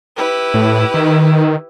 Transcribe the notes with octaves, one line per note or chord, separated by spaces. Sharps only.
E4 G4 B4
A2
D#3